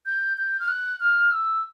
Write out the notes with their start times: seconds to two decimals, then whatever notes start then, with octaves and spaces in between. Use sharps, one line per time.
0.06 G6
0.37 G6
0.60 F6
0.68 F#6
1.00 F6
1.32 E6